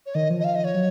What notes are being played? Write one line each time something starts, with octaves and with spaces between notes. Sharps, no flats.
C#5
D#3 D#5
F3
D#5
F5
D#5
C#5
F#3